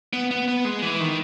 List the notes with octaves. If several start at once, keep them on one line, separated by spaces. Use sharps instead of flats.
B3
B3
B3
G#3
E3
D#3